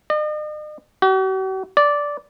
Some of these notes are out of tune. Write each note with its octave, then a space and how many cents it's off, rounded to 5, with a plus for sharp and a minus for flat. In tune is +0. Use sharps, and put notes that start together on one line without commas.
D#5 -45
F#4 +45
D5 -10